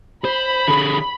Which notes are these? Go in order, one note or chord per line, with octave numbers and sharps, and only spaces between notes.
C5 B5
D3 G#4